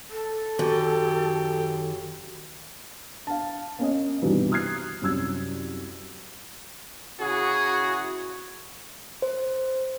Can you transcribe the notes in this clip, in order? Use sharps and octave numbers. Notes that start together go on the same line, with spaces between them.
A4
F#2 D#3 G4
F5 A5
A#3 C#4 D#5
C2 G2 B2 D#3 E3 G3
D#6 F6 F#6 G#6 C7
C2 F#2 E6 G#6
C#3 E4 F#4 G#4
C5